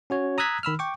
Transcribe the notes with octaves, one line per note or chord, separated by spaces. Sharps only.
C#4 F#4 C#5
A#5 D#6 E6 F#6 G#6 B6
D#3 B5 E6 F6
G5 C#6 D6